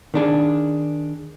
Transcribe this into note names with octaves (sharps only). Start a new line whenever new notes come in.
D#3 D4 G#4